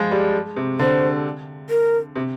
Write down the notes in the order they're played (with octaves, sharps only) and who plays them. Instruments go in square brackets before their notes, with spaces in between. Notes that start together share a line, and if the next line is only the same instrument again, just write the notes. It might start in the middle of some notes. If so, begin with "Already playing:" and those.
Already playing: [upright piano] F3 G#3
G3
C3
[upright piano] D3 [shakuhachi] C5
[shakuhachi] A#4
[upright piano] C3